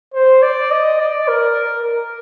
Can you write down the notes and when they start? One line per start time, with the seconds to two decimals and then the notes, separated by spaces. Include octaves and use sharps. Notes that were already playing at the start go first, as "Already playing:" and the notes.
0.14 C5
0.42 D5
0.71 D#5
0.99 D5
1.28 A#4
1.85 A#4